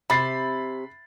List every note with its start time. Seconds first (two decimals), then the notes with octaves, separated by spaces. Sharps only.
0.10 C3 B5 A6 C7